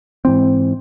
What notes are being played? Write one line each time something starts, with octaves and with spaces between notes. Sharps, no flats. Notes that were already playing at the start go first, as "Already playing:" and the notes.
G#2 E3 C4